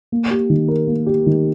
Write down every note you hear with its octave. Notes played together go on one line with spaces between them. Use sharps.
A#3
G4
D#3
A#4
A#3
G4
D#3